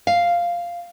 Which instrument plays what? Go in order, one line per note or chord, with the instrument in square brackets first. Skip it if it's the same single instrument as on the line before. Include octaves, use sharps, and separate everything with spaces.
[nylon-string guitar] F5